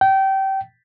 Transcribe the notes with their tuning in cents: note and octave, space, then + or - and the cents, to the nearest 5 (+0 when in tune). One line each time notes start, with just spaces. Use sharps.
G5 -25